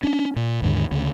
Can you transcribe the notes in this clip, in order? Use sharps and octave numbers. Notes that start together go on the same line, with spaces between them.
C#4 D4
A#2
D#2 G#2 D3
D2 C#3